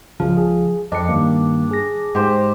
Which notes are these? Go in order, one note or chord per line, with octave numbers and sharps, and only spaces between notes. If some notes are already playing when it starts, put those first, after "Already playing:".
C#2 C#3 F3
G#4
F2 D4 D#5 C#7
G2 D#3 A#3
G#4 A#6
G#2 G4 C5